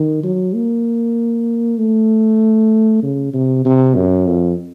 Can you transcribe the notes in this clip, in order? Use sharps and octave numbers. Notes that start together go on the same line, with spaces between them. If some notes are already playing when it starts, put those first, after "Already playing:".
Already playing: D#3
F#3
A#3
A3
C#3
C3
C3
F#2
F2